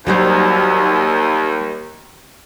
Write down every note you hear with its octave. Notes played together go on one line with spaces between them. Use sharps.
D#2 F#3 G3 C5